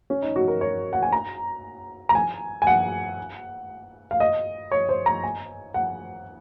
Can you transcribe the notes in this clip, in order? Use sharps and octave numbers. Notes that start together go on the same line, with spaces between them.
C#4
D#4
F#4
A#4
C#5
F#5
G#5
A#5
A#5
G#5
G#5
F#5
F5
D#5
C#5
C5
A#5
G#5
F#5